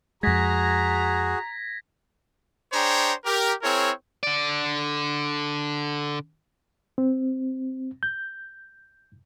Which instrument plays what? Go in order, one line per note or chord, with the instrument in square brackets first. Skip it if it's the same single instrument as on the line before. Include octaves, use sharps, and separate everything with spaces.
[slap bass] F2 G#3 [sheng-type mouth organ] F#4 G#4 [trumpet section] A#5 [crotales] G#6 A#6 B6
[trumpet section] D4 G#4 C5 C#5 G5 A#5
G4 A#4
C4 E4 G#4 A#4 C#5
[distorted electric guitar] D3 D5
[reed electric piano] C4
G6